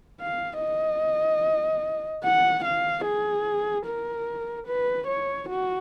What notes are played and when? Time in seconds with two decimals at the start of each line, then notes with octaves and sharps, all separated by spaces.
0.21 F5
0.61 D#5
2.24 F#5
2.64 F5
3.05 G#4
3.86 A#4
4.68 B4
5.08 C#5
5.49 F#4